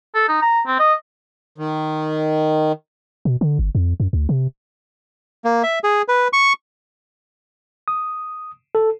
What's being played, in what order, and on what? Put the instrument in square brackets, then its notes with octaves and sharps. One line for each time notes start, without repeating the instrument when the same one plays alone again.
[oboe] A4
D#4
A#5
C4
D#5
[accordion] D#3
[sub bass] B2
D3
G1
F2
F#2
D2
C3
[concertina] A#3
E5
G#4
B4
C#6
[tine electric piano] D#6
A4